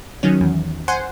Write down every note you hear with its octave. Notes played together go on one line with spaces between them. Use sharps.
D#3 F#3 C#4
E2
C5 F#5 G#5 C6